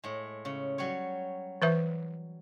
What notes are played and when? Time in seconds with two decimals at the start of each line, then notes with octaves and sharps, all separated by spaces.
0.04 A2 G#3
0.45 C#3
0.78 F#3 G3 C#5
1.62 E3 B4 E5